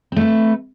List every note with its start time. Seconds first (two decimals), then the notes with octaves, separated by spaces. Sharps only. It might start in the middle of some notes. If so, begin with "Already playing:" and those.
0.12 C4
0.16 A3
0.21 B4